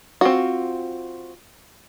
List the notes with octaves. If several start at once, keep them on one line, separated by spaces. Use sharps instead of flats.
C4 F4 F#4